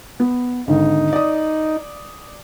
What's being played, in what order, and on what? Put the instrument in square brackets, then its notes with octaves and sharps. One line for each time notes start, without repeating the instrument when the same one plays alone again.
[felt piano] B3
[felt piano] G#1 D3 [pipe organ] D#4
[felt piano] D5 D#6